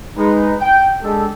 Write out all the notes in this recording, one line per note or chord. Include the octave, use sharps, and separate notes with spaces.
G#3 D#4 B4
G5
G#3 D4 G4 A4